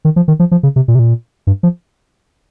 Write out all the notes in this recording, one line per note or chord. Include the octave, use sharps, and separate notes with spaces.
D#3
F3
D#3
F3
F3
C#3
C3
A#2
C3
A#2
G2
F3